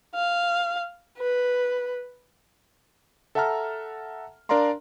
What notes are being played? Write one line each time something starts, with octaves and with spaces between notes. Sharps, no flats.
F5
B4
A4 E5 F#5 A5 A#5 F6
D4 A#4 D5 F5 A#5 C6